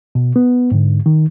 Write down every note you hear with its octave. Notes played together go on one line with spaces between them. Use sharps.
B2
B3
G#2 D3
D#3